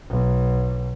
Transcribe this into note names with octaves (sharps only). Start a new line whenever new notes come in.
B1